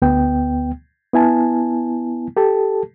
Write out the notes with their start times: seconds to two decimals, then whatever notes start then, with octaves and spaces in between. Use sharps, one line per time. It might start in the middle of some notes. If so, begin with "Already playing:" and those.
0.02 D2 B3 G5
1.14 B3 E4 G#5 A5
2.37 G4 A4 A5